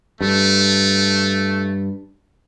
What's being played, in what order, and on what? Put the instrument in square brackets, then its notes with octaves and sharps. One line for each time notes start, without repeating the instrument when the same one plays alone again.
[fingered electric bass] G2 [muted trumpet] A3